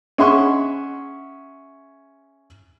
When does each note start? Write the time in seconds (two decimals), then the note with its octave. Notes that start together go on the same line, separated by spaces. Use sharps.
0.18 C#4 G#4 E5 F#5 C6 C#6